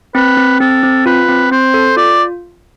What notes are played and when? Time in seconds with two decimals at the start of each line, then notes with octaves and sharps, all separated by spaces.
0.15 C4 B4
0.37 C4
0.60 C4 A4
0.83 C4
1.06 F4 B4
1.29 C4
1.51 C4 C5
1.74 A4
1.97 F4 D5